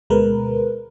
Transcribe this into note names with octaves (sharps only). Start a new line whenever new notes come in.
D2 B2 G#3 A#4 B4